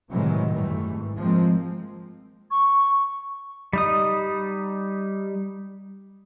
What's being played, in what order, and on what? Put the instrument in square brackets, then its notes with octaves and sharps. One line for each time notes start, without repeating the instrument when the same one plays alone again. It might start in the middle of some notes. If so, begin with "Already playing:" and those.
[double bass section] A2 C3 D#3 E3 F#3 G#3
G#1 F#2 E3 G3 A3
G#2
F3 G#3 A#3 C4
[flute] C#6
[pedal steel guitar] G3 D#4 D#6